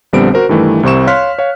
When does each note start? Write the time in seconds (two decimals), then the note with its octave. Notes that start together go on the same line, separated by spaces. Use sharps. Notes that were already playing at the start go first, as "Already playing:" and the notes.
0.13 A#1 D3 G3 B3 C4 D7
0.34 F#4 A#4 C5
0.49 G2 D#3 E3 A3
0.83 C2 C3 C4 C#6 E7
1.07 C#5 F5 C6 F6 F#6 B6
1.39 C#5 F5